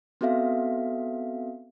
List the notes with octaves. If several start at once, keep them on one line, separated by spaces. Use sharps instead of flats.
B3 C4 F#4 A4 E5 F5